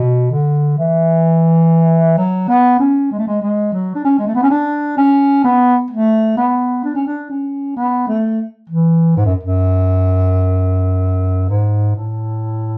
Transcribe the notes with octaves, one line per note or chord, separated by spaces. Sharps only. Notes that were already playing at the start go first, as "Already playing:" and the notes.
Already playing: B2
D3
E3
F#3
B3
C#4
G#3
A3
G#3
G#3
F#3
D4
C#4
G#3
A3
B3
C#4
D4
C#4
B3
A3
B3
D4
C#4
D4
C#4
B3
A3
E3
G#2
F#2
F#2
G#2
A2